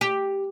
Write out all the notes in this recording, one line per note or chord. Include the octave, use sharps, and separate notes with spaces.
G4